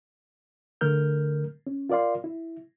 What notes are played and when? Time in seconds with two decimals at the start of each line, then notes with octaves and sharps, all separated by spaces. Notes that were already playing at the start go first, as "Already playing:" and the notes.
0.81 D3 A3 A#4 F6 G6
1.67 C#4
1.89 F4 A#4 D5 F5 C6
2.24 E4